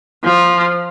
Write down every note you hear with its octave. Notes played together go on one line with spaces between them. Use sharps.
F3